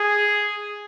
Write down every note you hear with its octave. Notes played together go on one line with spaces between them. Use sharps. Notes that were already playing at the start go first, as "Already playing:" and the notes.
Already playing: G#4